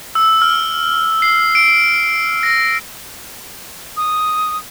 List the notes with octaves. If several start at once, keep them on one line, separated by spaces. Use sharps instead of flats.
E6
F6
C7
D7
A#6
D#6